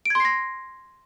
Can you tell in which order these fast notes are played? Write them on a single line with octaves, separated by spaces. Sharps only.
D7 G#6 C6 C7 A#6